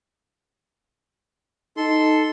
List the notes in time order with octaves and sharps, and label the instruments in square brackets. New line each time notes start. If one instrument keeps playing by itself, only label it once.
[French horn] D#4 [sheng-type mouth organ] A4 C6